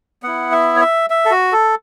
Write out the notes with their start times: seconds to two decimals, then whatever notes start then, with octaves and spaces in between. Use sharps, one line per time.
0.23 B3 E4 F#5
0.52 E5
0.76 C#5
0.81 E5
1.10 E5
1.25 A4
1.31 F#4
1.52 A4